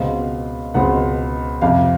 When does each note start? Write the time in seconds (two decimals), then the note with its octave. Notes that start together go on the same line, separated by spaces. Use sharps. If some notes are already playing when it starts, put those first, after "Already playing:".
Already playing: C#2 B2 G#3 C4 F5
0.74 C#2 B2 G#3 C4 F#5
1.61 F2 C3 F3 F5